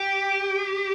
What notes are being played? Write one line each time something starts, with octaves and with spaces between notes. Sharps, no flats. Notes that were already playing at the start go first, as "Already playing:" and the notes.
Already playing: G4